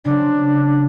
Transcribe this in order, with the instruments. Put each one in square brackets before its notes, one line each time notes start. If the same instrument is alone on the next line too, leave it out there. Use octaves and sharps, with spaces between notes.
[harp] C#3 F#3 C4 [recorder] D4